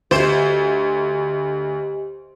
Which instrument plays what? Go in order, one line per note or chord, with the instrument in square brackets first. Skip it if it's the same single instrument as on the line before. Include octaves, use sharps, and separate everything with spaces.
[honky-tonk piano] D2 [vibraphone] G4 D#5 [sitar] C5